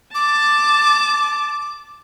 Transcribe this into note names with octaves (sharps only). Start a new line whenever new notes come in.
A5 D6